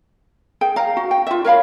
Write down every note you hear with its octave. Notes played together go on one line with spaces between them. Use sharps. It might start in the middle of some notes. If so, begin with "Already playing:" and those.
G#4 G5
F5 A#5
F#4
G5
F4 E5
A#4 C#5 F5 B5